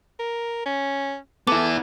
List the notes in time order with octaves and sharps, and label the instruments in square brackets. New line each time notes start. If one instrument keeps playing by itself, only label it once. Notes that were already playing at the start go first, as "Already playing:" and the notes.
[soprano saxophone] A#4
C#4
[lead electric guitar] B3 E4 [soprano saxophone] A4 [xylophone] D6